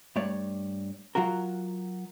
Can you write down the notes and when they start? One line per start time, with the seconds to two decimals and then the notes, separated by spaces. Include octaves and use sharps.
0.16 G2 A3 C#5 D5
1.15 F#3 F4 F#4 A#4